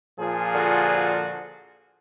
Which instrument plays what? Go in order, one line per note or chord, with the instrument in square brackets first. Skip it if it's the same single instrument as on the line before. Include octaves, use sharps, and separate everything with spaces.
[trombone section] A#2 F3 G#4
[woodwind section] D3 F4 F#4